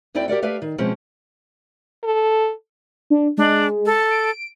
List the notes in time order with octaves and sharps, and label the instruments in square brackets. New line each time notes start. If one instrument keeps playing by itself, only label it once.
[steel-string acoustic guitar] D2 D3 C4 E4 D5 G5
G4 A#4 D5 F#5
A3 G4 B4 D5 E5 F5
D#3
B2 F3 G#3 C4 C#4
[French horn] A4
[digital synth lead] D4
[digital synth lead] G#3 [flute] D4
[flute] A4
[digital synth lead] D7